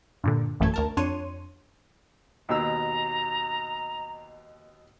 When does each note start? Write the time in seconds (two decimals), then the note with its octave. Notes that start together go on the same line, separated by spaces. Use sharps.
0.24 G2 A#2 D3
0.60 A1 F#2 A3 A4 G#6
0.74 D2 A#4 A5
0.97 F2 D4 C#5 C6 D#7
2.49 D#2 B2 A#5 E6